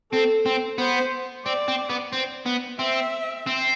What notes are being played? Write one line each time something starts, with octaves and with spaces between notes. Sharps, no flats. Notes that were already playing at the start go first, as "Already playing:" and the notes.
C4 A4
C4
B3 C5
C4 D5
C4
B3
C4
B3
C4 E5
C4